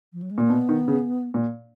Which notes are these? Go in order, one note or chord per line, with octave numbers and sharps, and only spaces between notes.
F3
F#3
G#3
A#2 A#3
B2 B3
D#3
C#3
A#2